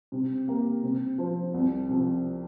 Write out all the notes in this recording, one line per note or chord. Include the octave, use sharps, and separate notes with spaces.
C3
A#3 G4 A#4
C3
F3 C4
C2
C3 F3